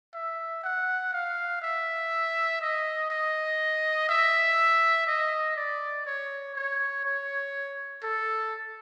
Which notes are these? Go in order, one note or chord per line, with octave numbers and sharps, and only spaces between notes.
E5
F#5
F5
E5
D#5
D#5
E5
D#5
D5
C#5
C#5
C#5
A4